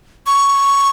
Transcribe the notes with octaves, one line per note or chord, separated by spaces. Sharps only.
C#6